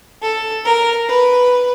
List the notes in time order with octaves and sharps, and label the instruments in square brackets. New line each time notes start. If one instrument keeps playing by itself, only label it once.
[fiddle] A4
A#4
B4